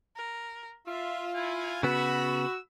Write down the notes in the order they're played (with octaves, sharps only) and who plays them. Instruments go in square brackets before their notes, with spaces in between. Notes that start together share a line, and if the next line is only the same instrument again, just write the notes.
[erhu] A#4
[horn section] F4 [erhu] E5 [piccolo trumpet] C6
[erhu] E4 [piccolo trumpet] G#5
[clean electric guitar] C#3 B3 [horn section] F#4 [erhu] B5 [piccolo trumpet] E6